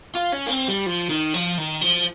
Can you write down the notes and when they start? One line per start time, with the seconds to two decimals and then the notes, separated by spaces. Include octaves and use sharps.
0.15 F4
0.32 C#4
0.47 A#3
0.50 C4
0.68 G3
0.86 F3
1.10 D#3
1.34 F3
1.58 D#3
1.81 F3